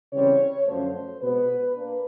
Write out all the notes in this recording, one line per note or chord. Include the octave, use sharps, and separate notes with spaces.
C#3 E3 G3 C4 C#5
F#2 D3 F3 A3 C5
B2 G#3 B3 B4
A#3 D4 B4